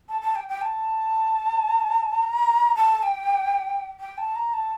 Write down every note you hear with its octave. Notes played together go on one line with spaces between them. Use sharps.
A5
A5
G5
G5
A5
A#5
A5
G5
G5
A5
A#5
A5